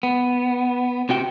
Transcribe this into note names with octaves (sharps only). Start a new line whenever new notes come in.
B3
C3 F#4 G5